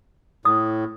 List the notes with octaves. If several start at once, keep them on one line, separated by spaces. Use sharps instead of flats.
A2 D#6